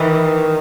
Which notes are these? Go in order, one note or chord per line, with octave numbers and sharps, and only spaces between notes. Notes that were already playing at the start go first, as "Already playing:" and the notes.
Already playing: D#3 E3